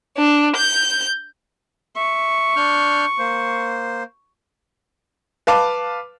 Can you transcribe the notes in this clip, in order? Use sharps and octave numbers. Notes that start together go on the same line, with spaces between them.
D4
G6
E5 C#6
D4 F6 G6
A#3 C5
B4 F5 A5 D6